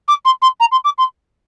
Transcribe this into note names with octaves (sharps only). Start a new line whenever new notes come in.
D6
C6
C6
A#5
C6
D6
C6